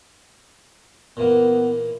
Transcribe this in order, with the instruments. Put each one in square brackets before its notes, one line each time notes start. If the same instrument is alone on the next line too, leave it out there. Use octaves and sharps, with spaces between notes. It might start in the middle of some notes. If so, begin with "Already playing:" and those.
[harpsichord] A#2 E3 A#3 [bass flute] B3